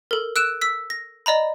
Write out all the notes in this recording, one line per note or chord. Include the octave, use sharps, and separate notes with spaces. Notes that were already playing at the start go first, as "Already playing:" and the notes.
A4 A#4
E6 F#6 D7 E7
E6 B6
A#6
D5 D#5 A#5 B5